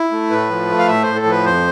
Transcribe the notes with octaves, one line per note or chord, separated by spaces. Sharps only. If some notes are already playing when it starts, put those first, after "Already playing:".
Already playing: E4
A3
A2 B4
F3
A3
F5
A2 E5
A2 C5
A4
F3 B4
F2 C5